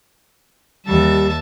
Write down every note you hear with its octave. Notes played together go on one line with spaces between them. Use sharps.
D#2 G3 E5 A5